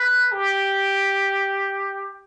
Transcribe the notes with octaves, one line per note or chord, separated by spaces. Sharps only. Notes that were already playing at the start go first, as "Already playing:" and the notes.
Already playing: B4
G4